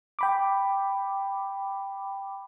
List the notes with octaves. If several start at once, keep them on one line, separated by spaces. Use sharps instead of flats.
G5 B5 D6